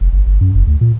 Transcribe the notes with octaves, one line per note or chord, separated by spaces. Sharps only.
F1
G1
G1
F#2
F#1
D2
A#2